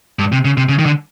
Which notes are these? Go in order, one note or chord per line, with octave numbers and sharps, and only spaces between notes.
G2
C3
C#3
C3
C#3
D#3
D3